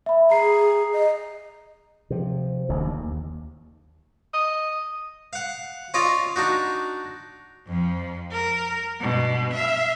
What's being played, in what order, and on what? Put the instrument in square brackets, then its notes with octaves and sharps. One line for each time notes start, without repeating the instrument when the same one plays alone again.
[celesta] E5 B5
[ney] G#4 [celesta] A#5 C7
[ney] D#5
[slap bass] C3 F3
D1 A1 D3
D#2
[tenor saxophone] D#5
[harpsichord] F5 F#5
C#4 F4 D5 D#5
D4 D#4 F#4
[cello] F2 F3
A#4
G2 B2
E5 F5